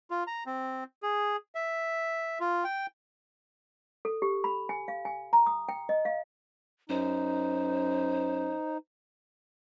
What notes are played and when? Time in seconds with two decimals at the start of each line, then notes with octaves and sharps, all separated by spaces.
0.11 F4
0.27 A#5
0.46 C4
1.03 G#4
1.55 E5
2.40 F4
2.64 G5
4.05 A4
4.22 G4
4.44 B5
4.69 G#5
4.88 F5
5.05 G#5
5.33 A#5
5.46 D#6
5.69 G5
5.89 D#5
6.05 F5
6.90 F#2 D#4 C5